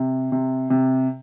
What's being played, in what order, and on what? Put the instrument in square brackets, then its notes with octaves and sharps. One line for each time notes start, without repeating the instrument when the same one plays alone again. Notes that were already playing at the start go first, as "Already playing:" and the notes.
Already playing: [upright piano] C3
C3
C3